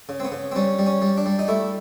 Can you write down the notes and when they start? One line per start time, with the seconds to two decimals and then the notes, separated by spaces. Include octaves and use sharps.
0.09 C#3
0.20 C4
0.25 B3
0.32 C#3
0.52 C4
0.56 G3 C#4
0.79 G3
0.87 C#4
1.02 G3
1.17 D4
1.26 G3
1.39 D#4
1.48 A3 E4